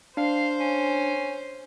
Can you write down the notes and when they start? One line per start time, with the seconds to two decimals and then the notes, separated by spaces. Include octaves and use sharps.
0.17 D4 C5 F5
0.60 C#4